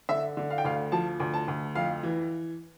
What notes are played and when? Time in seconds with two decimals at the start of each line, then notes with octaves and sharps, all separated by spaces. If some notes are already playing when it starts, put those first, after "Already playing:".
0.09 D3 E5
0.37 D3
0.50 F5
0.58 G5
0.65 D2 F5
0.92 F3 A5
1.20 D2
1.34 A5
1.48 D2
1.75 F2 F5
2.03 E3